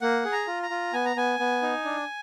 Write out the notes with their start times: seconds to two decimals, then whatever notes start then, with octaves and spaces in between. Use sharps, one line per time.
0.01 A#3 F#5
0.25 G#4
0.32 A#5
0.47 F4
0.63 A#5
0.70 F4
0.93 B3 G#5
1.05 A#5
1.16 B3 G#5
1.39 B3
1.62 D#4
1.85 D4